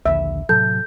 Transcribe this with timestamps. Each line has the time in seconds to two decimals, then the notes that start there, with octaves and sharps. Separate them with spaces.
0.06 A#1 D#2 D3 E5
0.49 A2 C3 F#3 A4 G6